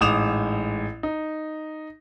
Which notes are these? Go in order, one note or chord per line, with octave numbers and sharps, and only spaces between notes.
A1 G#2 D6 D#6 E7 F7
D#4